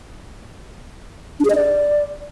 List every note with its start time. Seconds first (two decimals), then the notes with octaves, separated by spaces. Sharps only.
1.40 D4
1.45 G#4
1.50 D#5
1.55 D5